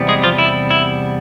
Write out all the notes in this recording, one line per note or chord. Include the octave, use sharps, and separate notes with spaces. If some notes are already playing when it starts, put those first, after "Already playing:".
Already playing: E2 C3 G3 B3
G#3 G#4
F3 F4
E4
E4